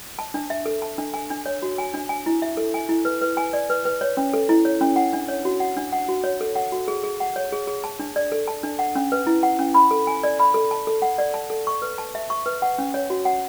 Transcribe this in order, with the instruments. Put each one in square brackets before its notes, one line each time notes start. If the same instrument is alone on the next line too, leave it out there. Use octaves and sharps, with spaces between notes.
[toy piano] A5
D4
E5
A4
A5
D4
G#5
D4
C#5
F#4
G#5
D4
G#5
E4
E5
A4
G#5
E4
B4
B4
G#5
D5
B4
B4
C#5
C#4
A4
E4
C#5
C#4
F#5
D4
C#5
F#4
F#5
D4
F#5
F#4
C#5
A4
F#5
F#4
G#4
G#4
F#5
C#5
G#4
G#4
A5
D4
D5
A4
A5
D4
F#5
C#4
B4
E4
F#5
C#4
B5
A4
G#5
D5
B5
A4
A5
A4
F#5
D5
A5
A4
C#6
B4
A5
E5
C#6
B4
F#5
C#4
C#5
F#4
F#5